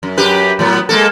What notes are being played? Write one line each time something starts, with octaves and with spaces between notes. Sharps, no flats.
F#2
F#2 G4 B4
A2 F#3 B3
G#3 A#3 A4